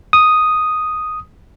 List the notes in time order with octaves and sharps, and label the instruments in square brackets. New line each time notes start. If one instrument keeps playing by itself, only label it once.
[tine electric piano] D#6